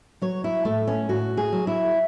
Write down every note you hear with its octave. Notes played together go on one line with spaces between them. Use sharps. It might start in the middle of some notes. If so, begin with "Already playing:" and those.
F#3 C#5
E4
A2 A3
C#4
A2 F#4
G#4
F#3
E4